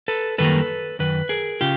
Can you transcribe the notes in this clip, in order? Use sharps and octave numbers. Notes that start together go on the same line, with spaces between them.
A4 B4
F#2 D#3 G3 A#3 A4 B4
F#2 D#3 B4
G#4 A#4
C#3 F4 G4